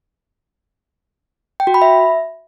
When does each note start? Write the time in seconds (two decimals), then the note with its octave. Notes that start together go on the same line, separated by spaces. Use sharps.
1.60 G5
1.67 F#4
1.74 B5
1.82 E5